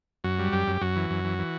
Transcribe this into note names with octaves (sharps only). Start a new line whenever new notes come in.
F#2 F#4
G3
F#2 G4
F#2
F#2 F#4
E3
F#2
E3
E3